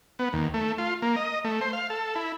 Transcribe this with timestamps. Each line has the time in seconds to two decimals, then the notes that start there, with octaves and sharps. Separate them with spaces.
0.19 B3
0.33 D#2
0.54 A3
0.78 F4
1.02 A#3
1.16 D#5
1.44 A3
1.61 C5
1.73 F5
1.90 A4
2.15 E4